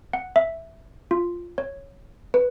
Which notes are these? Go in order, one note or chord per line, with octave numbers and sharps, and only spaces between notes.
F#5
E5
F4
C#5
B4